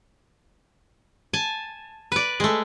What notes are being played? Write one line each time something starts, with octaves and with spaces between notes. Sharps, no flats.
G#5 A5
B4 D5
G#3 A3